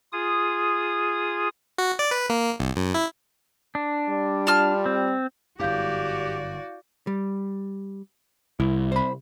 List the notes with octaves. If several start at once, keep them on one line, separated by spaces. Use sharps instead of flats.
F4 G#4 D#6
F#4
D5
B4
A#3
C2
F#2
E4
D4
G3
F4 A5 F6
C4
G1 F#2 E4 F#4 G4 D5 F5 G6
G3
C2 E4
C5 B5